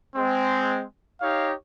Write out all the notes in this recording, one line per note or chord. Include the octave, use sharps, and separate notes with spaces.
G#3 C4
D#4 G4 C#5 F5